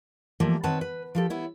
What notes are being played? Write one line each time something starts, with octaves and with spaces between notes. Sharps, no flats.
E3 F3 G3 A3 A#3
D#3 C4 B4 C#5 F#5 A5
B4
F3 G4 A4
B3 E4 C#5